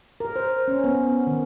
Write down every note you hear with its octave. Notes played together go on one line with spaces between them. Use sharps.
A#4
C5
C#4
B3
D#3